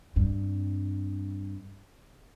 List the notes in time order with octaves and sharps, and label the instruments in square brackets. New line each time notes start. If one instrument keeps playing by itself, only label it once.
[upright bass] G2 C4